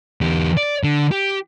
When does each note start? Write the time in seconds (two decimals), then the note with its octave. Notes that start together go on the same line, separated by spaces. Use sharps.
0.21 E2 G4
0.57 D5
0.84 D3
1.12 G4